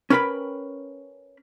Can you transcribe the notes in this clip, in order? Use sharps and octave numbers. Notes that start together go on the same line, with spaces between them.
C#4 A#4 B4 F#5 G5 B5